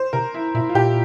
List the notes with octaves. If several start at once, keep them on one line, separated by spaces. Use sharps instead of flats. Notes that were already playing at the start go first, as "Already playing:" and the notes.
Already playing: C5
C3 A#4
E4
A#2 E4
F4
A#2 G4